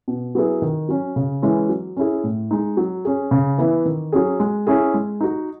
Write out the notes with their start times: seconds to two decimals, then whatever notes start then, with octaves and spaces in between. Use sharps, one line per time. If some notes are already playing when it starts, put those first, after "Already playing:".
0.08 B2
0.35 F#3 B3 E4 G#4
0.62 D#3
0.89 F#3 C#4
1.16 C#3
1.42 E3 G#3 C#4 E4
1.69 F#3
1.97 C#4 E4 G#4
2.24 A2
2.51 G#3 D#4
2.77 F#3
3.05 C#4 G#4
3.31 C#3
3.58 E3 B3 E4
3.86 D#3
4.12 F#3 C#4 G#4
4.40 G#3
4.67 C#4 E4 G#4
4.94 G#3
5.21 D#4 F#4